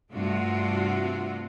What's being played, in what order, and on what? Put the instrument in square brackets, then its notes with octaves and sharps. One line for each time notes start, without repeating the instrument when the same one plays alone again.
[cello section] G2 C3 A3 F4 F#4